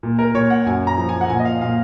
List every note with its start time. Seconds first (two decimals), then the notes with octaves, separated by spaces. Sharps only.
0.03 A#2
0.19 A#4
0.34 A#2 C#5
0.50 F#5
0.66 F#2 G#5
0.87 A#5
0.98 F3
1.09 G#5
1.21 F#5
1.29 A#2 G#5
1.40 D#5
1.45 F5
1.61 A#2 F5